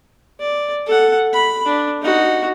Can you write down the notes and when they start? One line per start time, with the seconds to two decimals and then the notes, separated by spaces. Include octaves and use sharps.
0.40 D5
0.86 A4 F#5
1.33 B5
1.65 D4
2.02 D#4 F#4